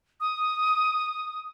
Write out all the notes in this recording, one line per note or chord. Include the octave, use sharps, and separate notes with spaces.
D#6